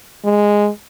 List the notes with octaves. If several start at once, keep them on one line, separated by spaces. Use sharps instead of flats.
G#3